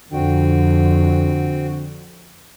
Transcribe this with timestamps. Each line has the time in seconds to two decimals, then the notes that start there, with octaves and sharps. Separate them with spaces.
0.13 F2 D3 C4 F#4 G5